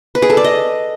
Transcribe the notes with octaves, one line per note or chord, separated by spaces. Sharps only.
B4
G#4
A4
D5
D#5